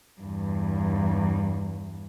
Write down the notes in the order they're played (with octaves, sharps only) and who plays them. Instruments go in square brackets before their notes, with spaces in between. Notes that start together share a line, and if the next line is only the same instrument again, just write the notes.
[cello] E2 G2